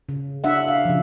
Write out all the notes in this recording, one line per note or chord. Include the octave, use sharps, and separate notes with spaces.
C#3
D4 E5 F#5
F5
C#3 F3